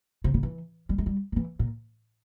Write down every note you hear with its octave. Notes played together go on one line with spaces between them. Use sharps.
C3
C#3
E3
G3
G#3
G3
F3
E3
A#2